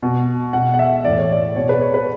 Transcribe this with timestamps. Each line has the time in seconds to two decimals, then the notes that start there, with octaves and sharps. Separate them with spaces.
0.02 B2
0.53 B2 F#5
0.74 F#5
0.79 E5
1.04 A2 E3 D5
1.18 C#5
1.32 D5
1.56 B2 C#5
1.69 B4
1.81 C#5
1.94 B4